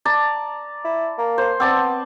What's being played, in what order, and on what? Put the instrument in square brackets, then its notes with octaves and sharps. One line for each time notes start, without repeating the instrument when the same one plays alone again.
[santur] D5 A5 A#5
[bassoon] E4
A#3
[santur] C5 C6
[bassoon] B3 [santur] C4 D5 A5